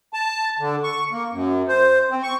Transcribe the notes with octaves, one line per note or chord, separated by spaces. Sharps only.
A5
D3
C#6
A#3
F#2
C5
C4
C#6